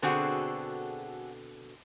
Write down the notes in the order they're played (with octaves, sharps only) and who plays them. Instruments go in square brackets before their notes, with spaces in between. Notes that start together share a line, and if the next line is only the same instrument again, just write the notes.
[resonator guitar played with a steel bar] B2 D3 C4 [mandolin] F#4 G#4 A4